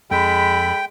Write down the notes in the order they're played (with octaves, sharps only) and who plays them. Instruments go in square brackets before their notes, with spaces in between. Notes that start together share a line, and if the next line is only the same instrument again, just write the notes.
[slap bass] F2 [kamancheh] G#3 [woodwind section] A4 B5 [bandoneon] G5